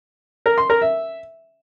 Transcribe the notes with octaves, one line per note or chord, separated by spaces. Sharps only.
A#4
C6
A#4
E5